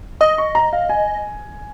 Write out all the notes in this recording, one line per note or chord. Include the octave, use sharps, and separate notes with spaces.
D#5 D#6
C#6
A#5
F5
G#5